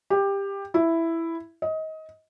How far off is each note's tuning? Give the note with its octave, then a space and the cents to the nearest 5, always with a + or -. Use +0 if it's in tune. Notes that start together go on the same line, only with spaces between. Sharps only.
G4 +15
E4 +5
D#5 +25